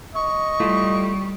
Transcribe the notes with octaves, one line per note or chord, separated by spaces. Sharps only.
D#5 C#6
G3 A3 E4 F4